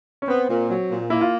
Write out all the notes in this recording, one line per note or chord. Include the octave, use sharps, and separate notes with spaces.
C#4
B3 C4
A#2
F#3
A#2
A#3 E4
F4